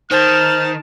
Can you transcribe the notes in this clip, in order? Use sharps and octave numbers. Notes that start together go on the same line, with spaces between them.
D#3 C5 A5 F6